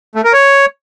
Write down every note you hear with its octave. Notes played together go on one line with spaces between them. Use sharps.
A3
A#4
C#5